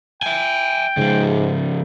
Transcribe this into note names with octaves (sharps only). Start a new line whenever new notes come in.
E5 G5 G#5
G#2 C#3 F3